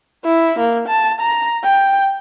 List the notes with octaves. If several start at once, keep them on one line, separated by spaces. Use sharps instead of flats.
E4
A#3
A5
A#5
G5